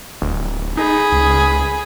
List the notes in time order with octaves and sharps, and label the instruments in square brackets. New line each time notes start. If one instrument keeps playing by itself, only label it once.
[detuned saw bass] D1
[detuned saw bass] D#4 [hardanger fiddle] G#4 B5
[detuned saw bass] C#2